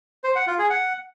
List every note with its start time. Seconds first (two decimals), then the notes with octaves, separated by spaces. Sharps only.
0.24 C5
0.35 F#5
0.47 F4
0.59 G#4
0.70 F#5